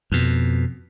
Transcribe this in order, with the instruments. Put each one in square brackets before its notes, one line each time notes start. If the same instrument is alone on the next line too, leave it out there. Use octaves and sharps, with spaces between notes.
[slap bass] F2 B2